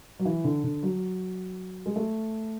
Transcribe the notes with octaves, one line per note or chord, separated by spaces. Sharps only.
F#3
E3
D3
D3
F#3
G#3
A3